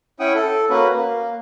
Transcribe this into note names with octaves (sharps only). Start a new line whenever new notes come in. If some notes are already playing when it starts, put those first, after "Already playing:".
C#4 E4 F#5 G5 D#6
A4
A#3 C#4 F#4 B4
A#3